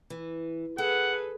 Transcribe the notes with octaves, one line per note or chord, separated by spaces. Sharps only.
E3
G#4 A4 B4 F#5